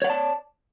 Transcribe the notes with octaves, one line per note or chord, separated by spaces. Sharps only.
C#5 D5 F#5 A5